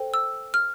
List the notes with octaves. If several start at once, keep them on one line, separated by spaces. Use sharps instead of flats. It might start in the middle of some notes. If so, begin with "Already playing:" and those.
Already playing: A4 C5 G5
E6
F6